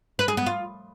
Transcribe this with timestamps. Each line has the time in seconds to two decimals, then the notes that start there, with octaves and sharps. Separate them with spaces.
0.19 B4
0.28 G#4
0.37 B3
0.46 F4